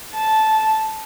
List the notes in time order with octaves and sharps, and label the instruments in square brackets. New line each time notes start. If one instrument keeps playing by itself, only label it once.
[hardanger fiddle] A5